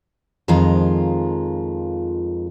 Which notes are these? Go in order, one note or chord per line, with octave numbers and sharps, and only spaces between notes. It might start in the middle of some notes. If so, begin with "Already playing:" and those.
F2 D#3 F3 G#3 F4 A#5